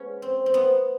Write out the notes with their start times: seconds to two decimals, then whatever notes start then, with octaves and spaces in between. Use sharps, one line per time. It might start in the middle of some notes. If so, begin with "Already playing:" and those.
Already playing: G#3 B3 C#4
0.22 C4
0.46 C4
0.54 B3